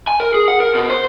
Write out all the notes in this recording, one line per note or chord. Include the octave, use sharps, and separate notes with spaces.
G#5
A#4
G#4
F#5
A#4
B2
C5